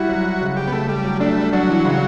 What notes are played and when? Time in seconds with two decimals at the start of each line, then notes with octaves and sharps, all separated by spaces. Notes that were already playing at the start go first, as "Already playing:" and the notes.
Already playing: G3 E4 F#4
0.09 F#3
0.25 E4
0.41 C#3
0.57 C#3 G4
0.67 B3
0.72 C#3 A3
0.88 G3 A3
1.04 F#3
1.20 A3 D4
1.37 G3
1.53 F#3 D4
1.69 E3
1.85 C#3